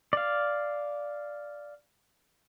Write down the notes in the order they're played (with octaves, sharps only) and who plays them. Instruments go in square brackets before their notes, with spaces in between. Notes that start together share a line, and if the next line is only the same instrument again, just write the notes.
[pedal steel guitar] D5 F5